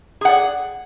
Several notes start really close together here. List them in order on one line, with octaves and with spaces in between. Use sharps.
G#4 F#5 D5